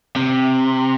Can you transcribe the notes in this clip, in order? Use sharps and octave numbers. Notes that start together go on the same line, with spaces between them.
C3